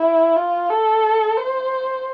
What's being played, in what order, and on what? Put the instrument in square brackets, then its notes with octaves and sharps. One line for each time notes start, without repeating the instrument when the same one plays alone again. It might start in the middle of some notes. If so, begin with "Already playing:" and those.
Already playing: [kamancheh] E4
F4
A4
C5